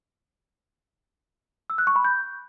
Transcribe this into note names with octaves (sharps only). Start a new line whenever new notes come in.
E6
F#6
C#6
B5
G6